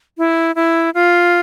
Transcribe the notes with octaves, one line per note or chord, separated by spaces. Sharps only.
E4
E4
F4